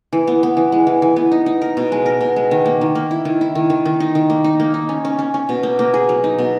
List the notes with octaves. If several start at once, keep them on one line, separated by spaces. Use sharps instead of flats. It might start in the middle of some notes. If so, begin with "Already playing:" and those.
E3
B3
B3
E3
G#3
E3
E3
B3
D#4
D#4
A#4
B2
G#3
A#4
B2
G#3
D#3
A#3
D#3
A#3
E4
D#3
E4
D#3
D#3
D#3
D#4
D#3
A#3
D#4
A#3
D#4
C#4
C#4
C#4
C#4
B2
A#3
A#3
G#4
F#3
D#4
B2